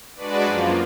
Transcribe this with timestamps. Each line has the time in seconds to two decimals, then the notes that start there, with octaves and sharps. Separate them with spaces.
0.16 G#3 D4 F#4 B4 D5
0.44 F#2 F3 A#3 F4